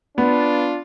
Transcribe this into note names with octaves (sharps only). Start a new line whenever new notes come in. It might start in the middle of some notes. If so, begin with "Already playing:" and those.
B3 D4 F4